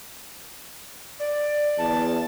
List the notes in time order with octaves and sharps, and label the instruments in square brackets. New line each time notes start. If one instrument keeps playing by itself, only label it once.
[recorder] D5
[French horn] E2 [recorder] A5